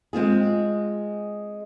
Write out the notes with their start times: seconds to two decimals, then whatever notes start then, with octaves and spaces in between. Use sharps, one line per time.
0.13 G#3 C4 F4 G#4